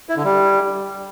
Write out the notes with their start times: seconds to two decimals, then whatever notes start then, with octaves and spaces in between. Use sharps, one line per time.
0.09 E4
0.17 D3
0.24 G3